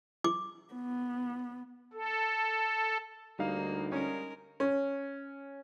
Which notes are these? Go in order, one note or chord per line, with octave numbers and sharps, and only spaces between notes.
D6
B3
A4
D2 G3 A#3 D#4 F5
G#3 C#4 A#4
C#4